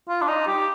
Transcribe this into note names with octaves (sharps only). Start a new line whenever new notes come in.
F4
D4
D#4
G4